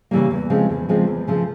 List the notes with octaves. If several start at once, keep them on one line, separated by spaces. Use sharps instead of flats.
C#3 E3 G3 A#3
E2
C#3 F3 G#3 C4
E2
C#3 F3 G#3 C4
E2
C#3 F3 A3